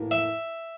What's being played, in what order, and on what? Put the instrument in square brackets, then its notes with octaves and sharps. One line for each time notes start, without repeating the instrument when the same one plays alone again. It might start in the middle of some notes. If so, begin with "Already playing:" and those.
Already playing: [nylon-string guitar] A2 E3 A#3 E4 A#4
[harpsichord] E5